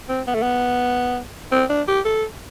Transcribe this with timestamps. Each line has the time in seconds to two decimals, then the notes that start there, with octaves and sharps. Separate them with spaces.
0.09 C4
0.27 B3
0.35 A3
0.42 B3
1.52 C4
1.70 D4
1.88 G4
2.05 A4